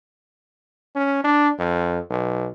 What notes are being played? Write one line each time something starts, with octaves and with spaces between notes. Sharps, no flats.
C#4
D4
F2
B1